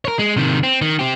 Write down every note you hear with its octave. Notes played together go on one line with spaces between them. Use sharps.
A#4 C#5
G#3
C3 D#3
C4
D#3
C4 G4